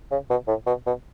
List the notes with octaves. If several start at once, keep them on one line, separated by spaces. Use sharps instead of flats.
C#3
B2
A2
B2
B2